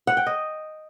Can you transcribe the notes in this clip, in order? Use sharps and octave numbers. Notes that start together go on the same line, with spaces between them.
F#5
G5
D#5